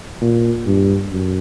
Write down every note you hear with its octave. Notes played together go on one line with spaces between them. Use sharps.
A#2
G2
F#2